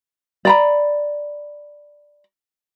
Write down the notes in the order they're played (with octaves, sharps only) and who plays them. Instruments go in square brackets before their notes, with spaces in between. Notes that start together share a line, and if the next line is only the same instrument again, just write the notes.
[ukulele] D5 A#5 B5